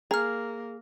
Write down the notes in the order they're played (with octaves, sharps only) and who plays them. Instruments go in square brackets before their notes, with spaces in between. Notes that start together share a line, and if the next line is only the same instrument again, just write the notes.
[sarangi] A#3 [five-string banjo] G#4 [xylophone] A#5 F6